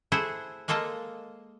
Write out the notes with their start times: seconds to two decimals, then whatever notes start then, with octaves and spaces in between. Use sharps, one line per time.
0.12 A3 E4 G#4 C5 F#5
0.68 G#3 A#3 F4 A4 D#5